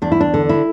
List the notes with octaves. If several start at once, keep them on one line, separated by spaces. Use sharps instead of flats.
E2 D4
E4
D4
D3
E4